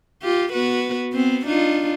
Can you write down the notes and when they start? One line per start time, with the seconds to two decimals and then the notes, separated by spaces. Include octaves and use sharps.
0.23 F4 G4
0.53 B3 F#4 B4
1.13 B3 C4
1.46 D4 D#4 F4